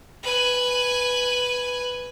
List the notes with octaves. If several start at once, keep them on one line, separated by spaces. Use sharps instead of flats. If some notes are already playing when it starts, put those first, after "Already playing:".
B4 G#5